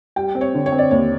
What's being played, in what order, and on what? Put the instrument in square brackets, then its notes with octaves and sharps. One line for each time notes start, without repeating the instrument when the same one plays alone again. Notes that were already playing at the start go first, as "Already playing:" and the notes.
[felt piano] G3 G5
C4
C#5
D3
C#5
C4
D5
D#2 C#5